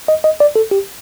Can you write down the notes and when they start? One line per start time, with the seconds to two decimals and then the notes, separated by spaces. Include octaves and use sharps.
0.08 D#5
0.24 D#5
0.40 D5
0.56 A4
0.71 G4